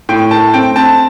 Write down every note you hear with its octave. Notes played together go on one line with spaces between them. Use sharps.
A2 G5
A3 A5
C4 G5
C4 A5